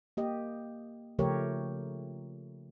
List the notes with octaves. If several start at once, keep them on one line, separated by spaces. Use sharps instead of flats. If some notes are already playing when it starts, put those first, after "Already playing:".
A#3 G4 D#5
C#3 F3 A3 G4 A#4 C#5